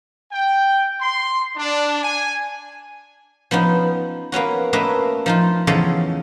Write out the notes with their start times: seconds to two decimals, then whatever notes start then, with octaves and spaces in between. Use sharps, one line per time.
0.32 G5
1.00 C6
1.56 D4
2.02 G#5
3.51 F3 B3 C#4 D#4
4.32 A#3 B3 C#4 F#4
4.73 A3 A#3 C#4 B4 D#5 E5
5.26 F3 D#4 F4
5.67 E2 C#3 F3 A4 C#5 D#5